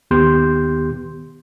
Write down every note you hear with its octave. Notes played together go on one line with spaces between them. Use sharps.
D#2 D#3 B3 G4 C6 G6